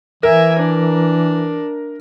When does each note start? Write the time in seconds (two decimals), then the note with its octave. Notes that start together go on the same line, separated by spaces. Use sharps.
0.23 E3 A#4 E5 G#5
0.59 D4